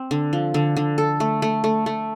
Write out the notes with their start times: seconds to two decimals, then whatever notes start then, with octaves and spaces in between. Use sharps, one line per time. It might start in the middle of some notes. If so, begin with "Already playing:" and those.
Already playing: C4
0.11 D3
0.33 F3
0.54 D3
0.77 D3
0.98 A4
1.20 A3
1.42 A3
1.64 A3
1.86 A3